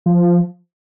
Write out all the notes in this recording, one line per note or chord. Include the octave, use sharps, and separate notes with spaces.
F3